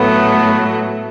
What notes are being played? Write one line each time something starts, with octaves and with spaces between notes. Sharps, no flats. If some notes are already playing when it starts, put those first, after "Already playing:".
Already playing: A2 F#3 A3 B3